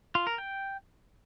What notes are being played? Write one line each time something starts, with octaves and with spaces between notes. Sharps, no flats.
F4
A#4
G5